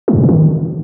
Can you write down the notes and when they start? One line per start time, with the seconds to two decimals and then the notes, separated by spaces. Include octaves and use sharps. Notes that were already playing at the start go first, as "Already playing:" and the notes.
0.08 F#3
0.13 F2
0.18 A2
0.23 C3
0.29 D#3